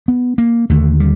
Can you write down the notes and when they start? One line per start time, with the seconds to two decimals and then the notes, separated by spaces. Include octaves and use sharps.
0.08 B3
0.38 A#3
0.70 D#2 D3 A3
1.00 G3